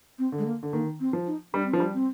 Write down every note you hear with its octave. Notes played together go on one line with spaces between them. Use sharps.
C4
D3
G#3
A#3
D3
D#3 A#3
C4
F3
D#4
G3 D4
C4
F3
D4
G3
C4